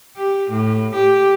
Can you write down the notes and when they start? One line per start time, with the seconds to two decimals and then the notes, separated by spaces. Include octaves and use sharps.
0.17 G4
0.51 A2
0.94 G4